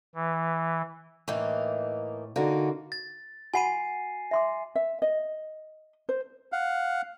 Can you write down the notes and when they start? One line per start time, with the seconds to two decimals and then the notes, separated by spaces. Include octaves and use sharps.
0.15 E3
1.28 A2 E3 A#3 D#4
2.36 D3 A#3 D#4 F#4
2.92 A6
3.54 F#4 F#5 G#5 B5 C7 D#7
4.31 E5 C6 D6
4.75 E5
5.02 D#5
6.09 C5
6.52 F5 F#5